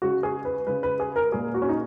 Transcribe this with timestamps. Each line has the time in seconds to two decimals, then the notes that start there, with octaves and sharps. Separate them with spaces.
0.02 C#3 G#3 F#4
0.23 G#4
0.45 B4
0.67 C#3 G#3 B4
0.83 B4
1.00 G#4
1.16 A#4
1.32 A#2 G#3 G#4
1.54 F#4
1.62 C#4
1.69 D#4